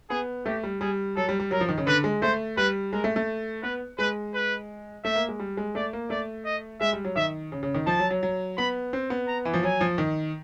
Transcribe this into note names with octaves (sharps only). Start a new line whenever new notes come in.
B3 G#4
A3 G4
G3
G3 G#4
F#3 A4
G3
G3
F#3 A#4
F3
D#3
C#3
D3 B4
G#3
A3 C5
G3 B4
G#3 A#4
A3
A3
B3 B4
G#3 B4
B4
A3 E5
A#3
G#3
G3
G#3
A3 D5
A#3
A3 D5
D#5
G#3 E5
G3
F#3
D#3 E5
C#3
C#3
D#3
F3 A5
F#3
F#3
F#3
B3 B5
C4
B3
A#5
E3
F3
F#3 G#5
F3
D#3